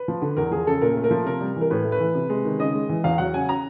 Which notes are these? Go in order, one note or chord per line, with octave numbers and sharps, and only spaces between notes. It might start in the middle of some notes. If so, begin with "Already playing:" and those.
Already playing: B4
F3
D3
E2 A#4
F3 G#4
C#3 A4
A#2 A#4
A3
A#4
F3
C3 A#4
G3
E3 A#4
A2 B4
A3
B4
E3
C3
G#3
D#3
C#3 D#5
G#3
E3
E2 F5
F#3 F#5
C#3 G#5
A#5